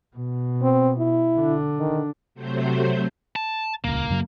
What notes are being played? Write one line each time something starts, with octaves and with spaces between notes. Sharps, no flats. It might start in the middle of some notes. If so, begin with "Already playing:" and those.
B2
C4
E4
D3 D4
D#3
C3 F#3 A3 C5 G6
A5
D#1 C#2 A#3
F#2 C#3 F#3